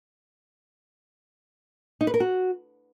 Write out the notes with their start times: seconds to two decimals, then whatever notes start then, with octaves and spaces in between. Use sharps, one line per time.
2.01 D#4
2.07 B4
2.14 A#4
2.20 F#4